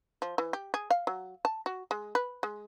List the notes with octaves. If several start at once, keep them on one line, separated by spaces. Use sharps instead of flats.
F3
E3
G4
G#4
F5
F#3
A5
F#4
G#3
B4
G#3